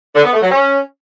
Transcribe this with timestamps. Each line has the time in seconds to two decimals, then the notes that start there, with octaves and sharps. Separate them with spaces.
0.15 D3
0.24 B3
0.33 A3
0.42 F#3
0.51 C#4